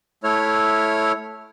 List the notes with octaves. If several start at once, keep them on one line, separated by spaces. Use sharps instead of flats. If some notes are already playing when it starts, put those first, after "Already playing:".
A3 E4 C#5 F6